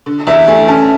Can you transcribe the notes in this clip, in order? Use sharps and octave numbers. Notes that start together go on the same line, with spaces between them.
D3
E2 E5
A3 G#5
C#4 A5